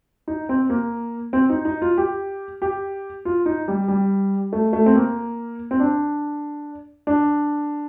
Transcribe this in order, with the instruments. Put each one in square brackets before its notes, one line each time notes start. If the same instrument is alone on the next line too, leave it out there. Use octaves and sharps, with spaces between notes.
[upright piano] D#4
C4
A#3
C4
D#4
D#4
F4
G4
G4
F4
D#4
G3
G3
A3
A3
C4
A#3
C4
D4
D4